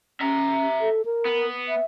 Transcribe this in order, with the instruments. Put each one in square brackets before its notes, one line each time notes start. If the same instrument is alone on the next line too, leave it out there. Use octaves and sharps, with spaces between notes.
[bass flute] C#4 [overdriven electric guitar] E5 A#5
[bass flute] A4
A#4
[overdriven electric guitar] B3
[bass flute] E5